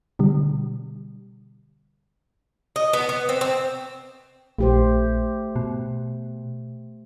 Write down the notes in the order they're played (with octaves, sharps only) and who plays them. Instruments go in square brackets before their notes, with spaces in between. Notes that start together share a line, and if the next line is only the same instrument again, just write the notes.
[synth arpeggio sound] B2 D3 G3
[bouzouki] D#5
B3
B3
C4
C4
[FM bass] A#1 [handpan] A3 G4 C5
[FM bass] B2